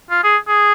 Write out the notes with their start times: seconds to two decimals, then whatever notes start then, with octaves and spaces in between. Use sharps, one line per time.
0.10 F4
0.24 G#4
0.48 G#4